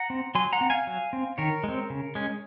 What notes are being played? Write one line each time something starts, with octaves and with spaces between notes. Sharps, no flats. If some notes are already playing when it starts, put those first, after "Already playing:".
Already playing: F#5 A#5
C4
F#3 G#5 C6
F#5 A#5
C4
F5 G#5
F#3
C4
D#3 A#4 C#5
G#3 C4
C#3
G#3 C#4